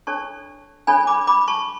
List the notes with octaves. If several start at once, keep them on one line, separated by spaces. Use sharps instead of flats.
D4 A4 C#5 A5 C#6
D4 A4 C#5 G#5 B5
B5 D6
B5 D6
A5 C#6